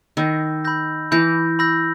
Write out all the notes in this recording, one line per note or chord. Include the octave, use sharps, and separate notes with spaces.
D#3 B5 E6 G6 A#6
B5 E6 G6 A#6
E3 B5 E6 G6 A#6
B5 E6 G6 A#6